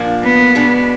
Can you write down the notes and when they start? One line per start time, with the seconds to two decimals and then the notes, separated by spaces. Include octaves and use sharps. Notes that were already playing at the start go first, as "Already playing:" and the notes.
Already playing: A#2 F3 A#3 D4
0.23 B3
0.55 B2 G#3 D4